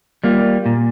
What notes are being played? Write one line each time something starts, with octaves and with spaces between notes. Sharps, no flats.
G3 A#3 F4
A#2